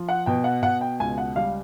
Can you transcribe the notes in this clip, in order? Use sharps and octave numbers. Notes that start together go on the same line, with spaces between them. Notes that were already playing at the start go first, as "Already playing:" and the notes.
Already playing: F3
F#5
B2 G5
F#5
B2 F#5
G5
C#2 G#5
F#5
G3 F5